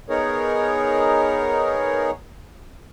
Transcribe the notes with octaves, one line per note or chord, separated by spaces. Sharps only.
B3 D#4 G#4 A#4 C#5